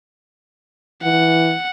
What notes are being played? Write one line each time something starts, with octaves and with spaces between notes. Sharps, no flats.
E3 F#5